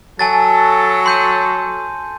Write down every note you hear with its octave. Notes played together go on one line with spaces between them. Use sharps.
F#3 A4 G#5 A5 A6
C6 G6 D#7